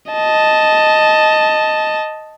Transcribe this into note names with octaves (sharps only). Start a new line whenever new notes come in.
D#5 A5